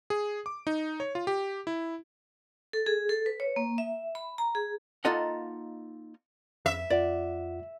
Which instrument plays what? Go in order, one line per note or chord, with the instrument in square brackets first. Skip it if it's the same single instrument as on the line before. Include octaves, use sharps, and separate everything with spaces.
[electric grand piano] G#4
D6
D#4
C#5
F4
G4
E4
[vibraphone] A4
G#4
A4
B4
C#5
A#3
E5
B5
A#5
G#4
[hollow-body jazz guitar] A#3 D#4 F4 A4 D#5 F#5
[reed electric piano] F2 [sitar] E5
[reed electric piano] F2 F4 F#5 [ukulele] D5